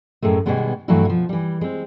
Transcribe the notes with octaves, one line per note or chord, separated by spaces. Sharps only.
F#2 A2 G#3 A3
B2 D#3 G3 G#3 B3
G2 E3 F#3 A3 E4 F#4
B2 F3
E3 G3
G#3 C4